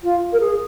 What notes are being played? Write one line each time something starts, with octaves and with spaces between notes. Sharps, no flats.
F4
A#4
G#4